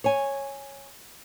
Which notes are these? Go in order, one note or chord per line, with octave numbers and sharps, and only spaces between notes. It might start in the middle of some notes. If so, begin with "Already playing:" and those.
C#5 G#5